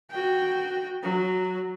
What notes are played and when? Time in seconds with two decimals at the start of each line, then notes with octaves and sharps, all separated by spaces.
0.11 F#4 G5
1.03 F#3